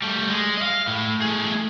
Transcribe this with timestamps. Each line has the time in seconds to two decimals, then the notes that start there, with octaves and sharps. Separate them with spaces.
0.02 G3 A3
0.30 G#3
0.57 D#5 F5
0.87 A2
1.21 A3 G#4